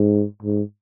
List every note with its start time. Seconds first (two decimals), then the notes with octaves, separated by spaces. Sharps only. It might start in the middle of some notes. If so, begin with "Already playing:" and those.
Already playing: G#2
0.43 G#2